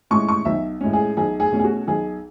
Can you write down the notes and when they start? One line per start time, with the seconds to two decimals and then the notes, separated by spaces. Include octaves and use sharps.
0.11 A2 G#3 C#4 C#6
0.28 C#6
0.45 B1 E5
0.81 A2 G#3 C#4
0.93 G#4
1.17 B1 G#4
1.40 G#4
1.52 B2 A3 C#4
1.59 G#4
1.64 F#4
1.88 B1 G#4